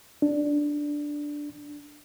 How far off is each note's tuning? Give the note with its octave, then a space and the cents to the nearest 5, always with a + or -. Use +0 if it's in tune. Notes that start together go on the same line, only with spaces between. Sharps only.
D4 +0